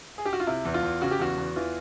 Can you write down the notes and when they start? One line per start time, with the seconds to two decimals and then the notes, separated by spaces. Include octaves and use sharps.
0.18 G#4
0.25 G4
0.33 F#4
0.40 F4
0.47 C3 E4
0.65 E2
0.74 F4
0.83 E2
1.01 C#3 F#4
1.11 G4
1.19 E2 F#4
1.38 E2
1.56 E3 F4